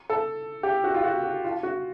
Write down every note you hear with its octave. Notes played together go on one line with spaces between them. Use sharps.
A4
G4
F#4
F4
F#4
F#4
F4
F#4